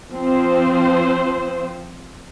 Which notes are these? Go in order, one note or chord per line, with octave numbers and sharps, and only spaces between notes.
F3 C4 C5